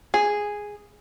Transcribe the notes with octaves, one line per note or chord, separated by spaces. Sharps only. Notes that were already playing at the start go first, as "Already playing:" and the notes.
G#4